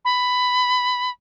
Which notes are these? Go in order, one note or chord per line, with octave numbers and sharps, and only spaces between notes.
B5